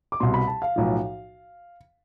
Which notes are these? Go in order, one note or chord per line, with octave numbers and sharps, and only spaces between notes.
D6
C2 B2 C6
B5
A5
F5
B1 A2 F3